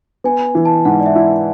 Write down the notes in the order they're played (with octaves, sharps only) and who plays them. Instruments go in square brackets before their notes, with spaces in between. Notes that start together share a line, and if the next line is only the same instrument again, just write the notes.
[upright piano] B3 [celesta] G#5
[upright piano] E3
[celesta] A5
[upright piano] G#2 [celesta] F#5
[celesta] D5
E5
[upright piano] E4
[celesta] E5